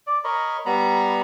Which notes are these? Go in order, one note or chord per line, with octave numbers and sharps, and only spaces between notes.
D5
A#4 C#5 D#5 B5
G3 B3 A#5 B5